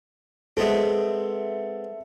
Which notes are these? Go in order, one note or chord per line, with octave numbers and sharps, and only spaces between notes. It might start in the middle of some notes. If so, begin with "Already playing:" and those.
G#3 B3 C4 A4 E5